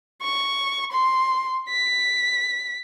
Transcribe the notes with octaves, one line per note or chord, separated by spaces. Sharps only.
C#6
C6
B6